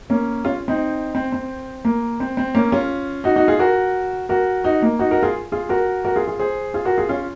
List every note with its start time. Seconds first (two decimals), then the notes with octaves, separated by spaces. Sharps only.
0.10 A#3 C#4
0.45 C#4 F4
0.68 C4 D#4
1.15 C4
1.32 C4
1.85 A#3
2.20 C4
2.37 C4
2.55 A#3 C#4
2.72 C#4 F4
3.24 D#4 F#4
3.36 D#4 F#4
3.48 F4 G#4
3.59 F#4 A#4
4.29 F#4 A#4
4.64 D#4 F#4
4.82 A#3
4.99 D#4 F#4
5.11 F#4 A#4
5.23 F4 G#4
5.52 F4 G#4
5.69 F#4 A#4
6.05 F#4 A#4
6.16 F4 G#4
6.28 F4 G#4
6.39 G#4 C5
6.74 F4 G#4
6.85 F#4 A#4
6.98 F4 G#4
7.09 C#4 F4